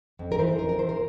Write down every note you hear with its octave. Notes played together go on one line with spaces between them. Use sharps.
F2
A#4
E3 C5
F2 A#4
A#4
E3 C5
A#4